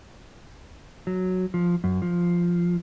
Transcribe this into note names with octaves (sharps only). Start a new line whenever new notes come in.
F#3
F3
F#2
F3